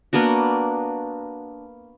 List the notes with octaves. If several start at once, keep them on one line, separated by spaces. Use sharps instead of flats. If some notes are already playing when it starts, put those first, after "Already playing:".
A#3 B3 D4 F#4